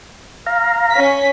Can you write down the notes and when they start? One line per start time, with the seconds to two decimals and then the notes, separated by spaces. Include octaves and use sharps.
0.46 F5 A#5
0.90 C#4 B6